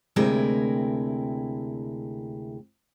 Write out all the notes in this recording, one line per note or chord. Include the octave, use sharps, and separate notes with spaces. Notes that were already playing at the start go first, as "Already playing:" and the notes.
D2 C3 G#3 E4 A#4 G5